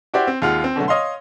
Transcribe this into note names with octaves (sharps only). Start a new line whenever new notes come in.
E4 F#4 G4 C5 D5
C4
D#2 G#3 F4 F#5
C4
B2 D3 F#3 A3
C#5 D#5 F5 C6